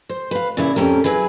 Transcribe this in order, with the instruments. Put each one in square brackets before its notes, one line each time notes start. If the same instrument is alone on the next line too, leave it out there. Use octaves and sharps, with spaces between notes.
[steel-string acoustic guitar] C5
B4 F5
A#2 C#3 E4
F2 C#4 G4 A#4
F#3 E4 G#4 B4